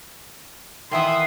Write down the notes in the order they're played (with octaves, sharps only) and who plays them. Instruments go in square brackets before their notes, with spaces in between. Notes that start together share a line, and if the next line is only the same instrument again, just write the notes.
[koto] D#3 E3 B3 [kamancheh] E5 D#6 [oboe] C6